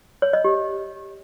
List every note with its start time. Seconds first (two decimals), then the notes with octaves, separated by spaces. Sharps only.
0.22 C#5
0.33 D#5
0.45 G4